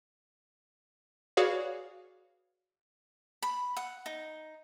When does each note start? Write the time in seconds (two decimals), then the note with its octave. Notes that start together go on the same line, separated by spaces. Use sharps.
1.37 F#4 G#4 B4 C#5 D5 F5
3.42 B5
3.77 F#5
4.06 D#4